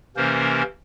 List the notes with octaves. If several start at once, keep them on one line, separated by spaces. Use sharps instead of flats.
C3 E3 A#3 C#4 A#4 C5